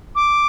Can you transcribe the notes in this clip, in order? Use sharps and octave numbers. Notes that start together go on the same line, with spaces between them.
D6